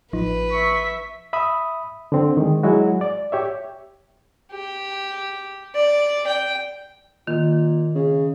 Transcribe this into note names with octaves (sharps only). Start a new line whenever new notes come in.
A1 F3 D#4 B4
E5 C#6 B6
E5 B5 D#6
D3 C4
D#3 G#3
F#3 G#3 E4 F#4
D5
G4 C#5 E5
G4
D5
G5
A#2 D#3
C#3